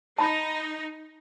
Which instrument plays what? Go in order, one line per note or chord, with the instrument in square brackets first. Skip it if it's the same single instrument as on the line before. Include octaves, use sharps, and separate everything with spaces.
[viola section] D#4 [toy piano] A5 B5